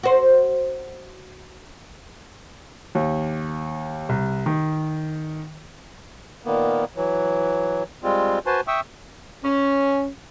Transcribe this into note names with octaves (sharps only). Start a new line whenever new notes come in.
F#4 C5
D#2
C2
D#3
A#2 D#3 A#3 B3
E3 F#3
G3 G#3 C4 F4
F#4 B4 C5 G#5 A5 C6
E5 G5 C#6 D#6 E6
C#4